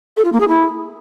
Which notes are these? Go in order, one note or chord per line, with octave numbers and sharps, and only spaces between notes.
A4
F4
A#3
G#4
E4